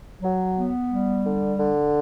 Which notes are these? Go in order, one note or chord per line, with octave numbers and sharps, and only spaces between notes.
F#3
B3
G3
D3
D3